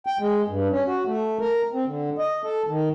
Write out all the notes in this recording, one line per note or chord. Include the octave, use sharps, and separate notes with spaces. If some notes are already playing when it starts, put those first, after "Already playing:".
G5
G#3
G2
C#4
F#4
A3
A#4
C4
D3
D#5
A4
D#3